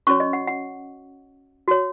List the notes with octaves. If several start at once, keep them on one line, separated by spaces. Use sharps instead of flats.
C#4 F#4 C#5 C#6
D#5
F#5
F#5
F#4 C#5